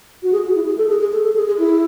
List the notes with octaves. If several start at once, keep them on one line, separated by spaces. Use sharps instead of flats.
F#4
G#4
F#4
E4
G#4
A4
G#4
G#4
A4
A4
G#4
G#4
E4